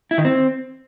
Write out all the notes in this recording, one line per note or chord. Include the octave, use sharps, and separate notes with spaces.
E4
D#3
C4